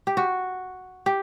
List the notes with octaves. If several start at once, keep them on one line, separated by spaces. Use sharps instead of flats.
G4
F#4
G4